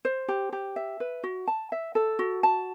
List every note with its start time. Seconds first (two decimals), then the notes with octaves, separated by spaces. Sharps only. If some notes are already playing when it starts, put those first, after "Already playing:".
0.05 C5
0.28 G4
0.53 G4
0.76 E5
1.00 B4
1.24 F#4
1.48 A5
1.72 E5
1.95 A4
2.19 F#4
2.43 A5